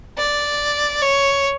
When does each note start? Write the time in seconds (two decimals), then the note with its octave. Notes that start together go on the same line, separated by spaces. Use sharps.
0.18 D5
1.02 C#5